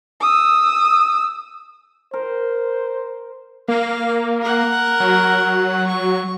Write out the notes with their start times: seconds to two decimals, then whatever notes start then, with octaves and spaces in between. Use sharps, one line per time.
0.21 D#6 E6
2.13 A#4 C5
3.68 A#3 F5
4.41 A#4 F#5
5.00 F#3
5.87 C#6